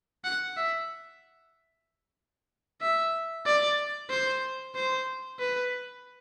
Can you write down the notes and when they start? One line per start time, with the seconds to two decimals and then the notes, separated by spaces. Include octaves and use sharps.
0.24 F#5
0.57 E5
2.82 E5
3.46 D5
4.10 C5
4.75 C5
5.39 B4